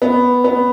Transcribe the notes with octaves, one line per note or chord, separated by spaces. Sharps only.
B3
B3